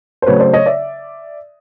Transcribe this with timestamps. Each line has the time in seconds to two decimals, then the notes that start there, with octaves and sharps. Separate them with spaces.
0.22 C5
0.26 C#3 F#3 A3 C4 B4 C#5
0.40 C5 D5
0.53 C#5 D#5
0.66 D5 E5